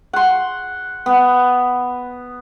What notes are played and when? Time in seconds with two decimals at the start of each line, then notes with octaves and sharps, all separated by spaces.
0.13 F#5 C6
1.06 B3